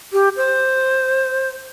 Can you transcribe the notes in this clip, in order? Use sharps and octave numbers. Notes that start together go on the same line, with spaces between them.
G4
C5